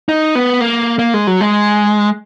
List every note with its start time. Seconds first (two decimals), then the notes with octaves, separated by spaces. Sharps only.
0.09 D#4
0.35 B3
0.61 A#3
0.99 A#3
1.14 G#3
1.27 F#3
1.41 G#3